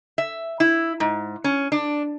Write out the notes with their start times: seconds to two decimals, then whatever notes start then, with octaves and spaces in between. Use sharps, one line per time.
0.18 E5
0.60 E4
1.00 G#2
1.44 C#4
1.72 D4